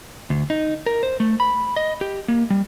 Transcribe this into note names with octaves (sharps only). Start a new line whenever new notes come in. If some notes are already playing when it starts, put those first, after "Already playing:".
D2
D#4
A#4
C5
A3
B5
D#5
G4
A#3
G3